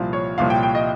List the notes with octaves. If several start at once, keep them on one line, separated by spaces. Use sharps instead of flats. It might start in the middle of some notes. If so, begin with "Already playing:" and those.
Already playing: C2 A#2 F3 F5
C#5
C2 A#2 F3 F5
G5
G5
D#5